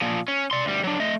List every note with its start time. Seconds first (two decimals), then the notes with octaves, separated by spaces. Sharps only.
0.01 A#2 F3
0.28 C#4
0.51 D5 C6
0.65 D2 G3
0.84 F#3 D4
1.00 A3 D#5